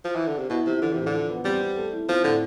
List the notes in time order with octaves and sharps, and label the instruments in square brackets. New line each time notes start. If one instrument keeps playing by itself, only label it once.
[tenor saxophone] F3
E3
D3
C3
[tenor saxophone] B2 [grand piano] E4
[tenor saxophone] C3 [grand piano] F3
[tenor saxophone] D3 [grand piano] E3
[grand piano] A2 [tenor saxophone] C3
[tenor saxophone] D3
[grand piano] F3
B3
[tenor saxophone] G3 [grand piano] C4
[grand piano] C4
A3
E4
[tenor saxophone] F3 [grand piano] C4
[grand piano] A2 [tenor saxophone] D3